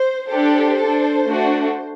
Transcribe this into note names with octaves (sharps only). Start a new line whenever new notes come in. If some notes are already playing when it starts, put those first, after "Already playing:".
Already playing: C5
D4 G4 A4 C5
D4 A4
A3 D4 F#4 A4